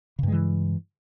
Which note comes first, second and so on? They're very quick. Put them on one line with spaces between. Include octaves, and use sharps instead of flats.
C#3 G2 G#3 E3